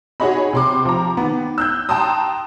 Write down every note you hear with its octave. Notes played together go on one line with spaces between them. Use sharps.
D#4 F#4 G#4 C#5 D#5 B5
C3 C6 D6
F3 A#5
D#3 B3
E6 F#6 G6
G5 A5 A#5 C6 D#6